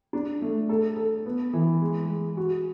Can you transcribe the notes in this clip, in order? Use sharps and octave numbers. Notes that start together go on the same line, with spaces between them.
D4
A3
A4
A4
B3
E3
G#3
G#3
F#4